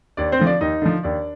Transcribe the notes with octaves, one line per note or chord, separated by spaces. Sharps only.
D#2 D4 D5
C4 C5
D3 F3
D4 D5
D#2 D#4 D#5
D3 F3
D#2 D4 D5